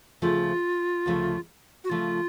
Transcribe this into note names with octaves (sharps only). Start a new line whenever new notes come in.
D2 C#3 F3 A3 F4
D2 C#3 F3 A3
F#4
D2 C#3 F3 A3 F4